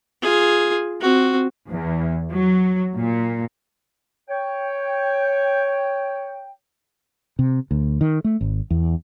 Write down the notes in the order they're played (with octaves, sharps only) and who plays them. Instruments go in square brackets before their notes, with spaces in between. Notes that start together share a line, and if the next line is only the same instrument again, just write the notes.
[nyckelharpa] F4 G#4
C4 F#4
[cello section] E2
F#3
A#2
[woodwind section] C#5 G5
[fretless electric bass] C3
D2
D#3
A3
G#1
E2